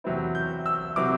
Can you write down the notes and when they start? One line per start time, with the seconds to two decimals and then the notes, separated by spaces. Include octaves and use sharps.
0.04 E2 C3 F#3 C4 E4
0.35 G6
0.66 E6
0.96 C3 F#3 C4 E4 D6